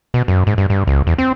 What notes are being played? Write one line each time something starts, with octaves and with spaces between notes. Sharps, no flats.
B2
F#2
G#2
G2
G2
C#2
E2
C4